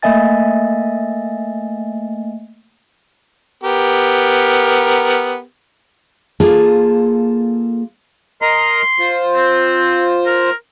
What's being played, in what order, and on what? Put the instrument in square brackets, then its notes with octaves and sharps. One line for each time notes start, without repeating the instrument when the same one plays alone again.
[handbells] A3 A#3 D#5 E5 G#5 A6
[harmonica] B3 G4 A#4
[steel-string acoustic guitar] A#3 F4 G#4 A4
[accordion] A#4 D#5 A#5 [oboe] C6
[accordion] F4 C5
[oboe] C4
A#4